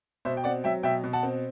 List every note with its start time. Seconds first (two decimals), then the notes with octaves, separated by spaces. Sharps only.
0.25 B2 C5 E5
0.37 G5
0.44 C4 D5 F#5
0.64 F#3 E5 G5
0.83 B2 E5 G5
1.04 B2
1.13 F#5 A5
1.23 C4